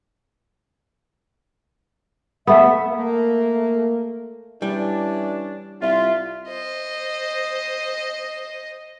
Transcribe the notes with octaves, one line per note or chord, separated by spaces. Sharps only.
A3 B3 E5
A3 A#3
E3 G3 C#4 D4
C2 F4 E5
C5 D#5